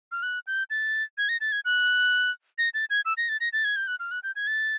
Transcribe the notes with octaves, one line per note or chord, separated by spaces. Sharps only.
F6
F#6
G6
A6
G#6
A#6
A6
G#6
F#6
A#6
A6
G#6
E6
A#6
A6
A#6
A6
G#6
G6
F#6
F6
F#6
G6
G#6
A6